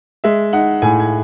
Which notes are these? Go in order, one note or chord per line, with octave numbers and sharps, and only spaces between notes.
G#3 E5
D#4 F#5
A2 G#5
G#5